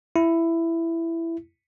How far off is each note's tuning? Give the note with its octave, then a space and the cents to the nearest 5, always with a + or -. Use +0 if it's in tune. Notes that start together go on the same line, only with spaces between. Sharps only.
E4 +10